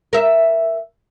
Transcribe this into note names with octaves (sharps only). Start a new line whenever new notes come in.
A#4 E5